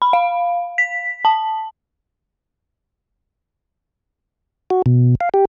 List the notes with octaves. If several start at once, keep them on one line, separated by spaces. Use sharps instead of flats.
B5
F5
B6
A5
F#4
B2
F5
G4